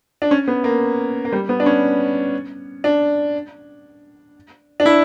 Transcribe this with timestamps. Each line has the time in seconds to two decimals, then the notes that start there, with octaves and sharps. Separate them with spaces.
0.22 D4
0.31 C#4
0.47 B3
0.64 A#3
1.25 A#3
1.32 G3
1.49 B3
1.60 D4
1.66 C#4
2.84 D4
4.80 D4
4.86 E4